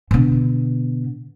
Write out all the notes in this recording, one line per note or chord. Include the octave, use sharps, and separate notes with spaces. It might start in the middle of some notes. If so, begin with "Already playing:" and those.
B2 D3